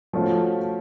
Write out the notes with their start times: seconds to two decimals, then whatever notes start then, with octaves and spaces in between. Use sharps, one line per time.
0.13 F3 A3 C#4 F#4